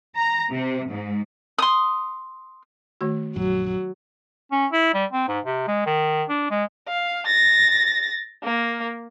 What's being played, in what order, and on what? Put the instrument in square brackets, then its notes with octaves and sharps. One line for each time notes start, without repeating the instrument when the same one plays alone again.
[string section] A#5
C3
G#2
[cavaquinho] C6 D#6
[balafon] D#3 A3 F#4
[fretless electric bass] A#1 F#2 [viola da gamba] F#3
[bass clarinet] C#4
E4
G3
C4
G#2
C3
G#3
D#3
D4
G#3
[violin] F5
A6 A#6
A#3